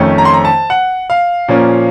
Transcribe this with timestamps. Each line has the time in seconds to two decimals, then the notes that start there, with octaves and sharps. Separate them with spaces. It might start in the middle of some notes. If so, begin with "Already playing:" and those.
Already playing: F2 D#3 A3 C#4
0.18 A#5
0.25 C6
0.34 A#5
0.45 A5
0.70 F#5
1.10 F5
1.48 A#2 F3 A#3 C#4